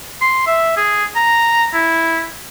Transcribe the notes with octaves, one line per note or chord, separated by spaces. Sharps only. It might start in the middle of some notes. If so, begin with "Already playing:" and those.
C6
E5
G#4
A#5
E4